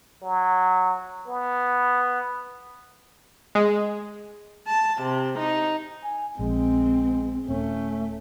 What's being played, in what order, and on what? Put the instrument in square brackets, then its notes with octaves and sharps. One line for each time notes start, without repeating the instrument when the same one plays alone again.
[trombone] F#3
B3
[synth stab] G#3
[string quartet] A5
C3
D#4
[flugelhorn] G#5
[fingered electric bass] A#1 [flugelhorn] G#3 [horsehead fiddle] C4
[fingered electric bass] D#1 [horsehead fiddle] A3 [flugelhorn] C#4